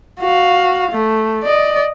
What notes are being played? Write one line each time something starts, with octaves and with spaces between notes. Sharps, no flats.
F#4 F5
A3
D5 D#5